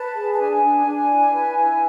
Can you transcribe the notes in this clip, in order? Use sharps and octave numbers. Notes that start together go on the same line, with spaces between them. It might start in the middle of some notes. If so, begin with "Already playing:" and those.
Already playing: B4 A5
G#4
A5
D4 G#5
D4
D4
E4
B4
E4